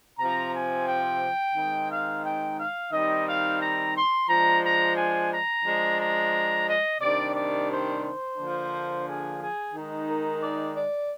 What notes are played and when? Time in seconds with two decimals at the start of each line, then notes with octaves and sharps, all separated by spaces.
0.18 C3 F3 C4 A#5
0.52 G#5
0.86 G5
1.55 D#3 G#3 C4 D#4
1.89 F5
2.23 G5
2.58 F5
2.91 D#3 G3 C4 D#4 D#5
3.26 F5
3.60 A#5
3.94 C6
4.28 F3 G#3 D4 A#5
4.63 A#5
4.96 G#5
5.30 A#5
5.65 F3 G#3 D4
5.99 A#5
6.68 D#5
7.01 C3 D#3 G3 D4 D5
7.35 D5
7.70 C5
8.03 C5
8.37 D3 F3 A#3 D4
9.06 G#4
9.40 G#4
9.74 D#3 G#3 D#4
10.08 A#4
10.42 D5
10.76 D5